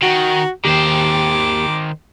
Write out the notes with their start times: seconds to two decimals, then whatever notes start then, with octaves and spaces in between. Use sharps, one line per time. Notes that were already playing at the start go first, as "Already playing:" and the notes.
0.02 D#3 F#4
0.65 D#2 D#3 G4 C5 D6